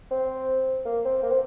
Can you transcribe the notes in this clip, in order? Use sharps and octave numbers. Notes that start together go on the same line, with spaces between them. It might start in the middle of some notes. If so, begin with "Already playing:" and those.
C4
A#3
C4
A#3
C4